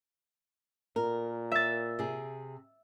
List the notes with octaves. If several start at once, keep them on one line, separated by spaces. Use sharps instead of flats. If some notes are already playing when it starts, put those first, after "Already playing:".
A#2 A#4
E5 A6
C3 G#4